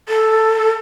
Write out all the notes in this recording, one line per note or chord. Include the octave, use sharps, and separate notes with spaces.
A4